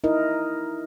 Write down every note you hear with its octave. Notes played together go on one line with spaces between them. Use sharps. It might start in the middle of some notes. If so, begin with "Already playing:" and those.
D#4 E4 A#4 D#5